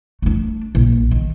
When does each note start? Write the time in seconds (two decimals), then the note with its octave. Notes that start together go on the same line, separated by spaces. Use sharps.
0.22 A3 D4
0.75 A#1
1.11 D#3